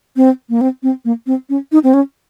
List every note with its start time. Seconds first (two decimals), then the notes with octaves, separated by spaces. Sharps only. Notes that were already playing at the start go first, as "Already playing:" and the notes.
0.16 C4
0.50 A#3
0.61 C4
0.83 C4
1.05 A#3
1.27 C4
1.50 C#4
1.72 D#4
1.84 C4
1.94 C#4